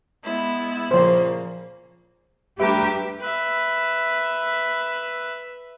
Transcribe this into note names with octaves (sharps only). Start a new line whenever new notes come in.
G#3 B3 E4
A#2 C#3 F3 A#3 C5
G3 A3 D4 G4 B4 E5 A#5
B4 E5